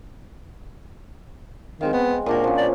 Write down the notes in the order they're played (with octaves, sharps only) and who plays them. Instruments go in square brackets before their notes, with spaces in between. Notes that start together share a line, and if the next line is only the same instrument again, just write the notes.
[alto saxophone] D#3 [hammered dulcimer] G#3 C4 F5
[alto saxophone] B3 [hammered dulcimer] C4
[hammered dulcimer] A#2 D4 F#4 [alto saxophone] A#3
[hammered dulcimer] F3 C#4
[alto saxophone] D5